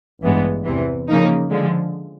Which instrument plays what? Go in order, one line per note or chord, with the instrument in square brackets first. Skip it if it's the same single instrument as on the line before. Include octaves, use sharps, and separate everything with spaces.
[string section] A1 G2 E3 G#3 B3
E2 C3 E3
C#3 F3 A#3 D#4
D3 F3 G#3